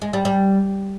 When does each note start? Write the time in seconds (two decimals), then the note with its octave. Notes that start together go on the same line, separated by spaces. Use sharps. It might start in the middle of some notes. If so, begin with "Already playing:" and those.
0.02 G#3
0.13 G3
0.25 G3